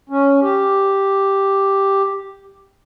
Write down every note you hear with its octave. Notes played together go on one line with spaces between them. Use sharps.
C#4
G4